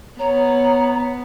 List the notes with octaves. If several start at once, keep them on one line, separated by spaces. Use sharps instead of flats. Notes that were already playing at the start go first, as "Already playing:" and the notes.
B3 C#5 A#5